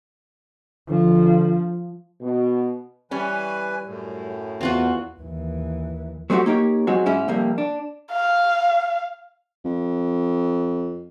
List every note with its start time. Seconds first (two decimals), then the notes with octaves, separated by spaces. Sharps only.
0.90 D3 F3
2.21 B2
3.11 E3 G3 C#4 B4 G#5
3.86 F#2 A2
4.61 E2 C4 F4 F#4
5.20 D#2 E3
6.30 F#3 A3 C4 D4 F#4 G4
6.46 A#3 D#4 G4 A#4 C#5
6.87 F#3 G#3 C4 F#4
7.06 G#2 C#4 E4
7.28 F2 C3 G3 A#3
7.58 D4
8.12 F5
9.65 F2